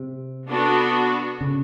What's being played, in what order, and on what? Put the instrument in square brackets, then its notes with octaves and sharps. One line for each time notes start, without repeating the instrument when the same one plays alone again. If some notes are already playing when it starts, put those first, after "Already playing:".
Already playing: [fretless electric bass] C3
[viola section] B3 D4 F#4 A4
[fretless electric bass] C#3